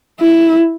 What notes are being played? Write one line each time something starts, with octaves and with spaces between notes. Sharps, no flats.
E4